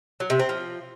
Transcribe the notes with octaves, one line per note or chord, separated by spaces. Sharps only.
F#3
C3
C4
F3